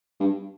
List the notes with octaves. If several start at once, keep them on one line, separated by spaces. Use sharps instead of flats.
G2